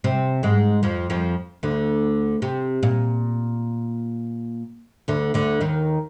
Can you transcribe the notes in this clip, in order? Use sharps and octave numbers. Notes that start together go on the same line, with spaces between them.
C3 C4
G#2 G#3
F2 F3
F2 F3
D2 D3
C3
A#2
D2 D3
D2 D3
D#2 D#3